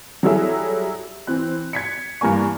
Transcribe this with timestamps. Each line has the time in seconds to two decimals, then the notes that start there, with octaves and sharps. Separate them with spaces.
0.23 F#3 G3 E4 G#4 A4 E5
1.27 E3 C4 F#6
1.73 G#6 B6 C#7
2.21 G2 E3 A#3 G#5 C#6